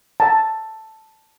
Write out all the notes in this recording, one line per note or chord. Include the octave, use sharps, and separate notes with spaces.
A5 A#5